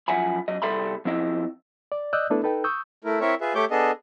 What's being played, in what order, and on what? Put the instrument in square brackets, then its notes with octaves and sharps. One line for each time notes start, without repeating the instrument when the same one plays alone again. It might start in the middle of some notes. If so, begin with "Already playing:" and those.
[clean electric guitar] F#2 F3 E5 F#5 G#5 B5
F#2 D#5
C2 G3 A4 E5 B5 C6
F3 C4 E4 D#5
[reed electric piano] D5
D5 D#5 D#6 E6 F#6 G6
A3 B3 D4 E4 A4 B4
D#4 A4 B4 G5
C#6 D#6 E6 G6
[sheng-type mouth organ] A3 E4 A#4
C4 E4 A#4 C#5 E5
F4 G#4 B4 E5
A3 G4 C#5 D6 G6
B3 D4 G#4 A4 D#5